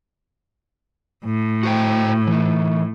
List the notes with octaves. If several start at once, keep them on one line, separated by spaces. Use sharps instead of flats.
A2
F#4 C5 G5
E3 D#4